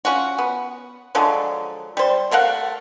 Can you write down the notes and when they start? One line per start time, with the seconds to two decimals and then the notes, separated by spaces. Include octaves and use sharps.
0.05 C#4 F4 F#4
0.38 B3
1.15 D3 F3 F#3 G#3
1.97 G3 C5
2.31 A3 A#4 F5 F#5